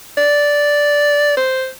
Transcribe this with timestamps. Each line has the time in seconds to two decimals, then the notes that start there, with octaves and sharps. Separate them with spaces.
0.17 D5
1.37 C5